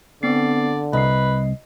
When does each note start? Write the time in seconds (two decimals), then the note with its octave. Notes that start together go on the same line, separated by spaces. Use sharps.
0.23 D3 B3 C4 D5 C7
0.93 C2 B4 D#5 C7